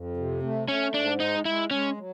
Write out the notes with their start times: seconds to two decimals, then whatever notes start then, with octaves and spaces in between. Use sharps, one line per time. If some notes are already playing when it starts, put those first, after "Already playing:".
Already playing: F2
0.17 C3
0.42 A3
0.68 A3 C#4
0.94 G#2 D4
1.19 G#3 D#4
1.45 G#3 E4
1.71 G#3 C#4
1.97 F#3